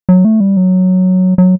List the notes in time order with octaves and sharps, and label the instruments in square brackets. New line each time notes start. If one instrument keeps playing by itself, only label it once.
[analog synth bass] F#3
A3
G3
F#3
F#3